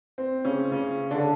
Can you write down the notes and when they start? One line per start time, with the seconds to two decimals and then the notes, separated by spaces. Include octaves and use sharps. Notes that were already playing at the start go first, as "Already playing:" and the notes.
0.18 C4
0.45 C#3 C#4
0.72 C#3 C#4
1.11 D3 D4